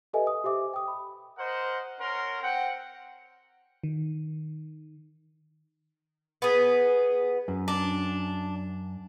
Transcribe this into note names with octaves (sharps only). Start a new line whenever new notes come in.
G4 A4 B4 D#5 E5 G#5
D#6
G4 C5 E5 D6
G5 D#6
B5
A#4 C5 D#5 F#5
C#4 A#4 F#5 C6
C4 F#5 G5
D#3
B3 G#4
F#2
D4